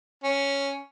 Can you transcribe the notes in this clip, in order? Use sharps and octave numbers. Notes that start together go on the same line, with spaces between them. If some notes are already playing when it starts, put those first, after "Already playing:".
C#4